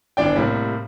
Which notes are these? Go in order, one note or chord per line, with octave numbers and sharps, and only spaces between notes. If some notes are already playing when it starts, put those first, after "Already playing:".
G1 E3 D4 D5 G5
A2 C3 G3 A#3